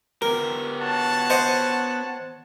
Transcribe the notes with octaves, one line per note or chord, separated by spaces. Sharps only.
B3 G4 A#4
F#4 C#5 A5
C5 D#5 F#5